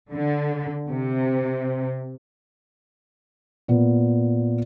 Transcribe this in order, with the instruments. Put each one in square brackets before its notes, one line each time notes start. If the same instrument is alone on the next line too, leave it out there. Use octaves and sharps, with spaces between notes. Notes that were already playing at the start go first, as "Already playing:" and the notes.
[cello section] D3
C3
[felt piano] A#2 B3